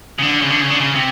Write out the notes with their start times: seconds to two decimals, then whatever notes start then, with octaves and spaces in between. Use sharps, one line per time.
0.18 C#3
0.22 D3
0.42 C#3
0.50 D3
0.61 C#3
0.70 D3
0.80 C#3
0.95 C3